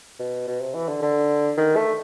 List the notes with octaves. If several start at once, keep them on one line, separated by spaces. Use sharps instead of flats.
B2
B2
C3
E3
D3
D3
D#3
A3